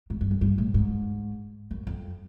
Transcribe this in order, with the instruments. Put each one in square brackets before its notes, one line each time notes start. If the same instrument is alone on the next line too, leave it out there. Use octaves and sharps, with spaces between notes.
[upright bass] G#2
G2
F#2
G2
A2
G#2
F#2
F2